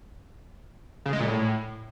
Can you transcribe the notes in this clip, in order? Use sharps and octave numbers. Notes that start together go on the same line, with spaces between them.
C#3
G#3
A#2
A2